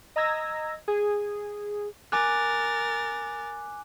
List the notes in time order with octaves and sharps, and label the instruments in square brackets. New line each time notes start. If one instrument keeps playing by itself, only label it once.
[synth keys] D#5 A#5 E6 G#6 A#6
G#4
[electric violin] A#4 A6 [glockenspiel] G#5 D6 F#6